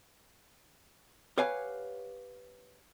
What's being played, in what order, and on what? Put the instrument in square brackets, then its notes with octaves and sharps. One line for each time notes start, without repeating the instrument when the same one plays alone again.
[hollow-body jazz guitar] G4 B4 C#5 F5 F#5 G#5